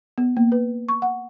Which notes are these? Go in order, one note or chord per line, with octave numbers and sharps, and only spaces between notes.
B3
A#3
B4
C#6
F#5